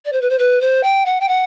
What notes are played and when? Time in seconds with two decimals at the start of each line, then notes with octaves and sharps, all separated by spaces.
0.05 D5
0.13 C5
0.22 B4
0.30 C5
0.39 B4
0.61 C5
0.83 G5
1.06 F#5
1.20 G5
1.28 F#5